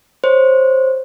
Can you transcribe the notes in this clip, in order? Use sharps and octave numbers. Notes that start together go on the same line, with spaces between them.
C5 C#5